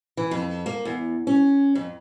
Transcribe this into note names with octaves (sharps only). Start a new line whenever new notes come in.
E3
F2
A#3
E2
C#4
F2